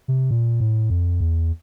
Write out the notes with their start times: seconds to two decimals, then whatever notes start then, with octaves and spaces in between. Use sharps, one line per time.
0.08 C3
0.31 A#2
0.60 A2
0.90 F2
1.21 E2